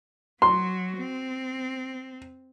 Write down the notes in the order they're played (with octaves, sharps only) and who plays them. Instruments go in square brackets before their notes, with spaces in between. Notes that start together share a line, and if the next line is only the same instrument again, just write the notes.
[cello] F#3 F#4 [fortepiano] C6
[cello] C4